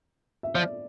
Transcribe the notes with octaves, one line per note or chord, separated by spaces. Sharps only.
E5
F3 D5